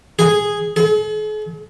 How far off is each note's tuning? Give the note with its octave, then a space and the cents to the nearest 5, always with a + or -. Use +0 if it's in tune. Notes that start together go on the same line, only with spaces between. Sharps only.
G#4 -5
G#4 +45